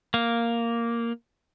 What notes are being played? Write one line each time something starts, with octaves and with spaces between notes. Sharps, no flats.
A#3